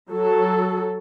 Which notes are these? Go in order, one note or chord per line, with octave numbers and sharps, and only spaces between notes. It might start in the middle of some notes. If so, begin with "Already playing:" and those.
F#3 A4